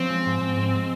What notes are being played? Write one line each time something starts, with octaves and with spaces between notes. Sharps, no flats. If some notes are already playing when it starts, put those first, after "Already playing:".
Already playing: F3 C4 C#4
G#3
G#2
G#2
G#3
G#3